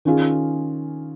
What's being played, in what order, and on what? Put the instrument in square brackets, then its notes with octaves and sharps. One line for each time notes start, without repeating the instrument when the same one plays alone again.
[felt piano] D#3 C#4 F4 G#4